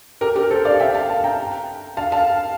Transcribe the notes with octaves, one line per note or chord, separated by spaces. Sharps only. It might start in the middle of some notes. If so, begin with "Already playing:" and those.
G4 A#4
G4 A#4
A4 C5
D5 F5
E5 G5
F5 A5
F5 A5
G5 A#5
F5 A5
F5 A5